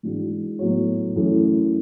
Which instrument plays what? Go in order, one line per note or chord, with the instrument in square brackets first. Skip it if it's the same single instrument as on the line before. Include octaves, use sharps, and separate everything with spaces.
[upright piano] G#2 E3 G#3 D4 F#4
A2 F#3 B3 F#4 C#5
F#2 E3 A3 E4